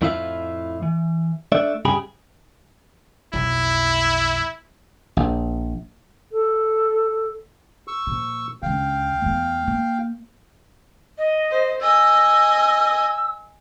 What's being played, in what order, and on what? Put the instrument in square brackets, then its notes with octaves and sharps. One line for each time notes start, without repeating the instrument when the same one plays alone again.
[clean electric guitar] F2 A2 E4 F4 E5 F5
E3
A3 D4 D5 E5
C2 G2 C#3 G4 G#4 B5
[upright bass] B1 F2 [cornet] E4
[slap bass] A#1
[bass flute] A4
[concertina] C#6 E6
[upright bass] A#2 F3
[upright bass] C#2 D3 [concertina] F5 G5
[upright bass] E2 A3
A#3
[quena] D#5
[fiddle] C5
[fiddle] D#5 G#5 [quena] E6